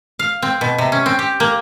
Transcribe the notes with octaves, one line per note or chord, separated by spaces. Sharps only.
F5
C4
B2
C3
C#4
C4
G4
A#3